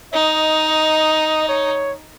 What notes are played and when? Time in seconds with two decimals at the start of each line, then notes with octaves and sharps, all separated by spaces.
0.14 D#4 D#5
1.49 C#5